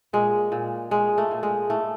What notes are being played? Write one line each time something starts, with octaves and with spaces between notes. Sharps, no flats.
A#2 G#3
A#2
A#2 G#3
A3
A#2
G#3
A2 A3